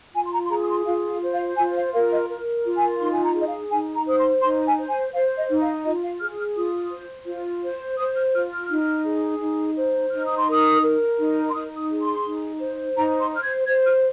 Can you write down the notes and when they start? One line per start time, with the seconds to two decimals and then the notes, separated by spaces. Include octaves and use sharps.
0.15 F4 G#5
0.26 C6
0.33 A#5
0.45 C6
0.50 G#4 A#5
0.63 D#6
0.69 C6
0.86 F4 F5
1.09 F5
1.22 C5
1.34 F5
1.57 F4 G#5
1.76 F5
1.93 A#4 F5
2.11 D#5
2.29 A#4
2.64 F4
2.77 G#5
3.00 D#4 C6
3.13 G#5
3.24 A#5
3.35 G#4
3.40 D#5
3.47 F5
3.71 D#4 G#5
3.95 A#5
4.07 C5 D#6
4.18 C6
4.42 D#4 C6
4.66 G#5
4.78 C5
4.90 G#5
5.14 C5 F5
5.37 D#5
5.49 D#4
5.61 F5
5.84 F4 D#5
6.03 F5
6.20 G#4 F6
6.38 F6
6.56 F4 D#6
6.91 C5
7.27 F4
7.63 C5
7.98 C5 D#6
8.15 F6
8.34 F4 F6
8.52 F6
8.70 D#4
9.04 G#4
9.41 D#4
9.77 C5
10.12 D#4 F6
10.25 D#6
10.37 C6
10.48 A#4 D#6
10.82 A#4
11.18 D#4
11.49 C6
11.54 D#4 D#6
11.77 D#6
11.90 G#4
12.02 C6
12.26 D#4
12.60 C5
12.97 D#4 A#5
13.20 C6
13.33 C5 F6
13.43 G#6
13.67 C5 G#6
13.86 F6